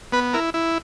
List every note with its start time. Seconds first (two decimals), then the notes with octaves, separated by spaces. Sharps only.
0.12 B3 B4
0.33 E4 A#4
0.54 E4